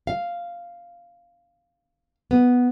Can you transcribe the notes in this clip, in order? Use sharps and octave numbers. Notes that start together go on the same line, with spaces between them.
F5
B3